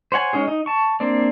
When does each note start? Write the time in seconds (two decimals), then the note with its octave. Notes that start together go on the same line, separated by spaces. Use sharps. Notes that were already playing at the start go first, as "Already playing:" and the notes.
0.12 C5 C#5 F#5 G#5
0.33 G#3 C#4 D#4 G#4
0.48 D#4
0.66 A5 C#6
1.00 A#3 C4 D4 D5